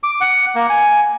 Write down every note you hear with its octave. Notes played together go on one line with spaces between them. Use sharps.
D6
F#5
A#3
G#5